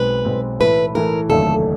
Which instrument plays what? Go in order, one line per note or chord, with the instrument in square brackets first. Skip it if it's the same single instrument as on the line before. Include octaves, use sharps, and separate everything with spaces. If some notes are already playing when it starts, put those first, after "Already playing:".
Already playing: [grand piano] B1 B2 G#3 C4 [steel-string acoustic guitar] B4
[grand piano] B1 B2 G#3 C4
[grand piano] A2 E3 A3 [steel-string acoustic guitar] B4
[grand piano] A2 E3 A3 [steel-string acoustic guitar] A#4
[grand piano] F1 D#2 D3 F#3 A3 [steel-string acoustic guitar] A4